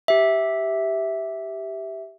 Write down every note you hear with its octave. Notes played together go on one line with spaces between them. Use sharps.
G4 E5